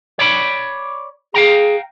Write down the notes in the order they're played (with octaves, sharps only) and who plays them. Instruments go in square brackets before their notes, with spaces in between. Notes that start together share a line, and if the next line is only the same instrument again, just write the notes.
[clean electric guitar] C#5 D5 B5
[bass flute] G#4 [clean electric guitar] F5 G5 A#5